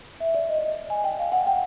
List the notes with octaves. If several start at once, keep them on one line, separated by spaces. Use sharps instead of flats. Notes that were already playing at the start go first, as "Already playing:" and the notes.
E5
D5
D#5
D5
D#5
G#5
G5
F5
F#5
G5